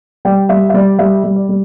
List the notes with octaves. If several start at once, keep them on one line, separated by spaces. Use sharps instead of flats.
G3 D5 G5
G3 E5
E5
G3 D5
G3 E5
G3
D5
G3